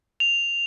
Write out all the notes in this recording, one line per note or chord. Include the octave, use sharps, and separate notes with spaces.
F7